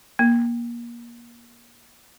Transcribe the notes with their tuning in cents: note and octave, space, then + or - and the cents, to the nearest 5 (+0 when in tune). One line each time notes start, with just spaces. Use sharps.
A#3 +25